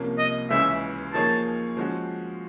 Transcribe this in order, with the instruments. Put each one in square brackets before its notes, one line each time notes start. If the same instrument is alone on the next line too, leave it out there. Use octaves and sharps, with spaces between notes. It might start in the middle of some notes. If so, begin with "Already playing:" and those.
Already playing: [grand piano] C2 C3 F3 A#3 C#4
[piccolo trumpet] D#5
[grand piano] C#2 C#3 E3 G#3 C#4 [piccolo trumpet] E5
[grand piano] F3 A#3 D#4 G#4 C#5 [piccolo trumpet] A5
[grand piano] F3 G#3 C#4 F#4